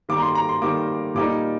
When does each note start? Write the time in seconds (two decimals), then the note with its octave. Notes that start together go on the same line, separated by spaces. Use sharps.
0.09 D#3 G3 A#3 D6
0.17 A#5
0.22 C6
0.35 A#5
0.49 C6
0.62 D#3 G3 A#3 D6
1.15 A#2 G3 A#3 D#4 D6